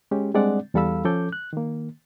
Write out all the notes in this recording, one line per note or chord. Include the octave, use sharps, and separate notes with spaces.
G#3 C#4 G4
G3 G#3 C4 D4 D5 F#5
E2 G3 A4 F5 B5 E6
F3 C#4 A4 D6 G6
F#6
D#3 A#3